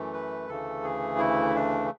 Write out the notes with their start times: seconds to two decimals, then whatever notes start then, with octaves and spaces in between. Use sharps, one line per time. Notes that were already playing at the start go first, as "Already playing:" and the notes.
Already playing: F#2 E3 A3
0.13 B4
0.48 D2 C#3 E3 A3 A4
0.84 G#4
1.18 E4
1.55 D4